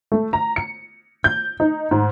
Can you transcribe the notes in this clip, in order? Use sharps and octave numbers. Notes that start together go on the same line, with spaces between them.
A3
A#5
C#7
G6
D#4
G#2